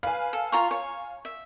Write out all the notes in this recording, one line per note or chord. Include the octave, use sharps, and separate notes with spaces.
B4 F5 G#5
A4
F4 A#5 C#6
C#5
E5